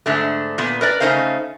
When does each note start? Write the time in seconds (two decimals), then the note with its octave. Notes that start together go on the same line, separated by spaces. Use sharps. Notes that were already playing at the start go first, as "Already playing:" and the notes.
0.06 G#2 D3 A3
0.58 A#2 B3
0.81 A#4 B4 D5
1.00 C#3 A3 C#4 D#4 C5 F5